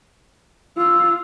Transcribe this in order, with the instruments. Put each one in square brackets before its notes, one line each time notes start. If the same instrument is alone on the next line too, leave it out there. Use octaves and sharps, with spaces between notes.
[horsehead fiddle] F4 [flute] E6